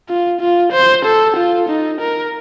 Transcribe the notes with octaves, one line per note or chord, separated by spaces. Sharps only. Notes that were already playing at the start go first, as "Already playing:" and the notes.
F4
F4
C5
A4
F4
D#4
A#4